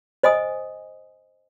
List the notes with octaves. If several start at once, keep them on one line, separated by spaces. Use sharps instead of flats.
C5 D#5 G#5 D#6